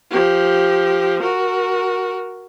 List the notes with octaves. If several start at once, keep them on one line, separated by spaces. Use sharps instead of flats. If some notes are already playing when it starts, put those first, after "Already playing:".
F3 G4
F#4 A#4